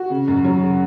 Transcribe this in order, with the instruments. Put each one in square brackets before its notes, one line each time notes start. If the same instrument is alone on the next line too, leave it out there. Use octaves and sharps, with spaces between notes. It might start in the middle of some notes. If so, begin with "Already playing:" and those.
Already playing: [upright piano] F#4
C#3
F#2
F#3
C#3